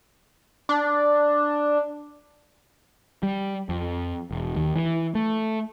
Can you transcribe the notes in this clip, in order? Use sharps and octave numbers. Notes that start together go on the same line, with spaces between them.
D4
G3
F2
E1
D#2
E3
A3